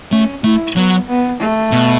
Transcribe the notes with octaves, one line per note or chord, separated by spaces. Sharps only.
A3 C#4
A3 E4
F#3 B3
B3
A3
B2